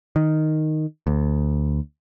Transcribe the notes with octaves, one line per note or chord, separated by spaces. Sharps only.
D#3
D2